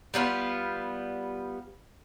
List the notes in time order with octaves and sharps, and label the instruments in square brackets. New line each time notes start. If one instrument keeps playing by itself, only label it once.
[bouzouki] G3 B3 D#4 F4